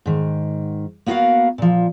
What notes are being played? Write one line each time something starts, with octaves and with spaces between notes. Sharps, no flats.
G#2 D#3
A#3 B3 F#4 G4 A#4 F5
A#2 F3